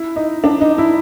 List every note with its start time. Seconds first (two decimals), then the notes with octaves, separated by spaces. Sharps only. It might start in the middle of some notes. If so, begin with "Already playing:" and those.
Already playing: E4
0.16 D#4
0.44 D4
0.61 D#4
0.78 E4